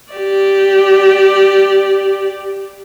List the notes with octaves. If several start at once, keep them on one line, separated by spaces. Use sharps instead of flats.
G4 D5